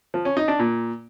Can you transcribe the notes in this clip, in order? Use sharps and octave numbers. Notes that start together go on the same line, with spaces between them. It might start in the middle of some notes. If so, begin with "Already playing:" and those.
F3
C#4
D#4
D4
A#2